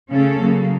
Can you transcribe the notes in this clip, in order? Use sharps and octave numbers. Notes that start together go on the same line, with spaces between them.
C#3 A3 C#4 A4
C#3 F#3 A#3